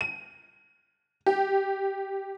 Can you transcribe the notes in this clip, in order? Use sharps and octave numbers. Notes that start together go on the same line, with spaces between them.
D#7
G4